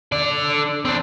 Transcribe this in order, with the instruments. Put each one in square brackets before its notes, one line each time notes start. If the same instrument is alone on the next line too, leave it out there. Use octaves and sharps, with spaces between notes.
[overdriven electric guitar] D3 D5
C4 D4